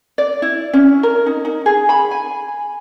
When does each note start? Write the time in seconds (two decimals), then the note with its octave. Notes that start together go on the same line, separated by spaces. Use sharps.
0.18 D5
0.42 E4
0.73 C#4
1.03 A#4
1.26 D#4
1.45 D#4
1.66 G#4
1.89 B5
2.11 G#5